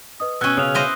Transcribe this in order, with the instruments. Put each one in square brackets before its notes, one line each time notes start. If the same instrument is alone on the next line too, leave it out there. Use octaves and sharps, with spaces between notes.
[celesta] B4 D#5 D#6
[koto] B2 C#4 [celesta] B4 G#6 D#7 [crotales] E6 F#6
[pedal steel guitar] C#3 F5 [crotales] D#6
[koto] E4 C5 D#5